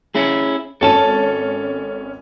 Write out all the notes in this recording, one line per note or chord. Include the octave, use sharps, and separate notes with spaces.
C#4 E4 G#4
G#1 C#4 A4 A5 D#7